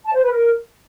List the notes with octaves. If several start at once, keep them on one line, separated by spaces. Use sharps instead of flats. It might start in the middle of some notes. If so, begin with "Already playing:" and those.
A5
C5
B4
A#4